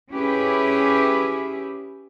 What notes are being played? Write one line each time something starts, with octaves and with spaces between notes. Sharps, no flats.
C#4 E4 G4 G#4 B4